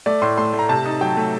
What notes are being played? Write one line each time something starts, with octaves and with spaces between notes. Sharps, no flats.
A3 D5
A2 C6
A3 C6
A3
A#5
C3 A5
D#4
F#3 G5
A3